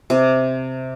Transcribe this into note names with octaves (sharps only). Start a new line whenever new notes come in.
C3